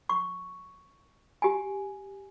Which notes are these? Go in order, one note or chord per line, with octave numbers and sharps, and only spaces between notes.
C#6
G4 G#5